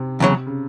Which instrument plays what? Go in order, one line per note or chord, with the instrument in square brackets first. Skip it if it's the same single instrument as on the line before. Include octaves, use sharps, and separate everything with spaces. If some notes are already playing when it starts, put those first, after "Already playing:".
Already playing: [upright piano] C3
[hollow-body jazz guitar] E2 C#3 F#3
[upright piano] C#3